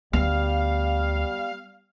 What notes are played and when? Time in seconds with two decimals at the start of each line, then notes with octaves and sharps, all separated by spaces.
0.13 D2 G3 B3 F5